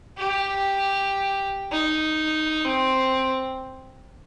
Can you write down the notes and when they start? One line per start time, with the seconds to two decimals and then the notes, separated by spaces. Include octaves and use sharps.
0.18 G4
1.72 D#4
2.65 C4